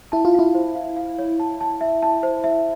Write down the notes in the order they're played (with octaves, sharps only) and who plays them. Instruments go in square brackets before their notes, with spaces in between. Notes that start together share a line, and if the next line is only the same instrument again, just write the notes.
[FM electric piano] E4 [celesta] A5
[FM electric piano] F4
[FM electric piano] E4 [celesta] F5
[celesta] C5
F5
F5
C#5
A5
A5
E5
A5
C5
E5